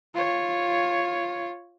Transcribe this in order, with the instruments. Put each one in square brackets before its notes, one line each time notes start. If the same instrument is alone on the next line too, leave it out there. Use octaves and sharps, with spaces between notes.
[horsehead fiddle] F4 C#5